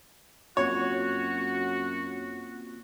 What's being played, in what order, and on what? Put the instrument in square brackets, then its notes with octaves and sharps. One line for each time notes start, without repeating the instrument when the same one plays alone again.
[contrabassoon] F#2 [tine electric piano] A#3 C4 F4 [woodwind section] F#4 [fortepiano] C#5